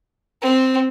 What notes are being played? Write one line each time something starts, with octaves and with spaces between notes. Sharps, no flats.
C4